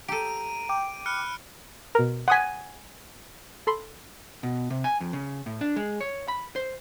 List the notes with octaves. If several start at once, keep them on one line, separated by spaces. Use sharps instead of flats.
G4 A4 A#5 D7 D#7
G5 D6
B5 F6 F#6 C#7
B2 A#4
F#5 G#5 C6 D#6 B6
A4 B5 C6
B2
C3
G#5
F2
C#3
A2
D4
G#3
C#5
B5
C5